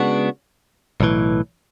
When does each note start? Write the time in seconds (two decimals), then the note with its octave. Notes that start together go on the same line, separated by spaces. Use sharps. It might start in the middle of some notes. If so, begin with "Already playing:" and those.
Already playing: C#3 G#3 B3 D4 F#4
1.01 B1 A2 E3